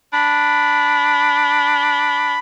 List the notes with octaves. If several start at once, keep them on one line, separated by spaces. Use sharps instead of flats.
D4 B5